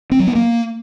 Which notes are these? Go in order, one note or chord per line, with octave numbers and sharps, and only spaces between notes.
C4
F#3
B3
A#3